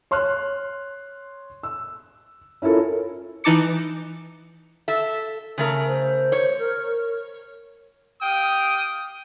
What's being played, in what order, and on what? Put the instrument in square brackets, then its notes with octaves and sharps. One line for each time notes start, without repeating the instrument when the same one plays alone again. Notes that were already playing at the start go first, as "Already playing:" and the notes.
[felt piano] C#5 C6 F6 F#6
E6
C#4 E4 F4 A4 A#4
[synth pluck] E3 D#4 A5 D6 C#7
[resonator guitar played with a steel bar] A4 E5
C#3 A3 A#4
[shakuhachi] C5
[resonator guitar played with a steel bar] C#5
[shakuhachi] A#4
[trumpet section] G4 F5 G5 D#6